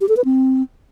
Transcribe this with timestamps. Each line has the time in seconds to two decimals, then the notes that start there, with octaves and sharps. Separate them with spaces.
0.01 G4
0.09 A4
0.17 B4
0.25 C4